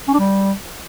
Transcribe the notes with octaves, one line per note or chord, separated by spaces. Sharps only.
C#4
D4
G3